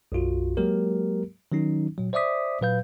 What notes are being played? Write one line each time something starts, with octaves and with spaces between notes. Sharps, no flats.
B1 F#2 F4 F#4
F#3 G#3 A#3 G4 A#4
D#3 F#3 C#4 D#4
A#2 F#3
C5 D5 E5 D6 D#6 B6
A#2 F#3 B4 F5 G6